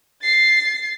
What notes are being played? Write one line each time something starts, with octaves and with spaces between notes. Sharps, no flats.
A6 C7